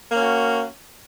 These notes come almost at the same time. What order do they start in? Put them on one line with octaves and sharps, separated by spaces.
A#3 C#4 F#4